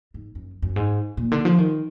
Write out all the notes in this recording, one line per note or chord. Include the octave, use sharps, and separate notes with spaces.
G#2
F#2
F#2
G#2
A#2
D3
F3
D#3